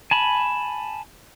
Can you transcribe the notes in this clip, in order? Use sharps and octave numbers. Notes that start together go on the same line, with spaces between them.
G#5 A5 B5